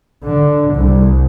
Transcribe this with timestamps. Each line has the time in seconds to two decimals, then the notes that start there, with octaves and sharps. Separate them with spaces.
0.24 D3
0.75 C2